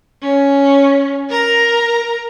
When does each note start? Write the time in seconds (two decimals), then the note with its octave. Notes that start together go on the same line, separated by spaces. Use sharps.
0.22 C#4
1.29 A#4 A#5